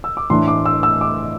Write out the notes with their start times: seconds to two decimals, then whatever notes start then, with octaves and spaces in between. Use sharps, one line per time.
0.04 E6
0.17 D6
0.30 A2 E3 A3 D4 C6
0.48 D6
0.66 E6
0.83 E6
1.01 D6